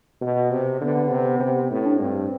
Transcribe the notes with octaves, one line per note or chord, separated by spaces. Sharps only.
B2
C3
D3 B3
C3
C3
A2 C4
D4
G2 C4